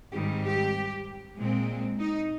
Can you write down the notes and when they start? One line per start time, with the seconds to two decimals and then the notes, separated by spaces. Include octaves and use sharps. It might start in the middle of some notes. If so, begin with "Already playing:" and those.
0.12 G#2 D#3 G3 C4 G4
0.44 G4
1.37 A#2 G#3 C4
1.99 D#4